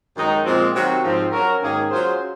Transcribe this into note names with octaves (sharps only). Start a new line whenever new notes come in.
F#2 D#3 G#3 D#4
A#2 F3 G#3 C4
C3 D#3 F#3 C4 F#4
G#2 F3 C4
F#3 C#4 F#4 A#4
G#2 D#3 A#3 C#4 G#4
F#3 C#4 F4 G#4 C5